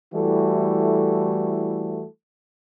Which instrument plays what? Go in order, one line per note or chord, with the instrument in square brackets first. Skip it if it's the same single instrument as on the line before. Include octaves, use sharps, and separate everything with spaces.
[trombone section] E3 G3 A3 E4 F#4 A4